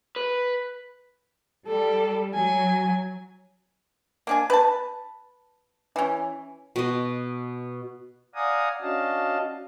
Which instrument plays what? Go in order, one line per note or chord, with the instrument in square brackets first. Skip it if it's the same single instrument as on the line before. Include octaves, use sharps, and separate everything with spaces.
[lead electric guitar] B4
[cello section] G3 [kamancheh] A4
[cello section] F#3 [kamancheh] G#5
[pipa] A#3 D4 G#5
B4 A5
E3 C#4
[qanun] B2 D#5
[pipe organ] D5 F5 F#5 G#5 A#5 D#6
C#4 D4 F#4 D#5 F5 A5